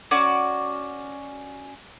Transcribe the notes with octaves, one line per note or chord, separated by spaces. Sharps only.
C#4 F#4 D5 D6